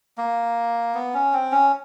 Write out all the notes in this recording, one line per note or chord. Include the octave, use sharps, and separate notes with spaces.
A#3
B3
C#4
C4
C#4